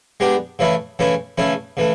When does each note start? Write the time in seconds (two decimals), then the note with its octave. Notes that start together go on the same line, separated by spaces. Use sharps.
0.20 G#3 B3 D4 G4
0.59 C#3 E3 A3 C#4 E4
0.99 C#3 E3 A3 C#4 E4
1.38 C#3 E3 A3 C#4 E4
1.77 C#3 E3 A3